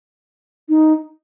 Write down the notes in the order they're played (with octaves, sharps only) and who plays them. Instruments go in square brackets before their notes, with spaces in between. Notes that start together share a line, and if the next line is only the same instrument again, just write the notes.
[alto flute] D#4